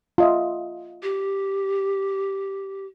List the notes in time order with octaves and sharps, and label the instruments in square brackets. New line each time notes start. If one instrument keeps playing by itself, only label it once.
[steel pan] F4 D#5 E5
[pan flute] G4